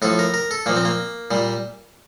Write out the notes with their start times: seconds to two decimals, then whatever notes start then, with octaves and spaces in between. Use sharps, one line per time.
0.02 A2 F3 A4
0.19 A#4
0.34 A#4
0.51 A4
0.66 A#2 F3 A#3
0.76 C4
0.85 A#3
1.31 A#2 G3